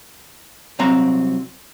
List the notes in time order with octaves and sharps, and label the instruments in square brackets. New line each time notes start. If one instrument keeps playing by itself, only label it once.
[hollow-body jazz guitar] C2 F#3 C4 A#5